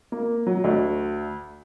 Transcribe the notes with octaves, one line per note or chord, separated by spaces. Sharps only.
A#3
F#3
D2